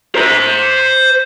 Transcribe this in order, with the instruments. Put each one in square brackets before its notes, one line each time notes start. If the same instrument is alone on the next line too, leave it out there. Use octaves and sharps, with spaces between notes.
[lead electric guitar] C5 A#5